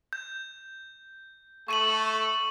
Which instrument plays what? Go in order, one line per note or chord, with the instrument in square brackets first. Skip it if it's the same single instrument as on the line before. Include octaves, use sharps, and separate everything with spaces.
[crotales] G6
[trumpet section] A3 A4 [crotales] C#6 D#7 F#7